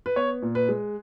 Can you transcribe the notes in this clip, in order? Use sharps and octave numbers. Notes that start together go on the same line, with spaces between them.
B4
B3 C#5
A#2
B4
G#3